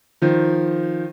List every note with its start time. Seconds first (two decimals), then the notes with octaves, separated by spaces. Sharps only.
0.22 D#3 F3